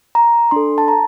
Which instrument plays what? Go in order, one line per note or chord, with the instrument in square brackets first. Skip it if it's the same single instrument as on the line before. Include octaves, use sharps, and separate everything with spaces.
[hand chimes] A#5
D4 A4 C6
A5
A#5